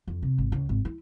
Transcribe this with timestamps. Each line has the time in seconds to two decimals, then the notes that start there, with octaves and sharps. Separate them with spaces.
0.07 F2
0.22 C3
0.38 G#1
0.52 C#2
0.69 G#1
0.85 E4